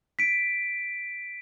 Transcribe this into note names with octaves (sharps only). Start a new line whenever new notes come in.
B6 D7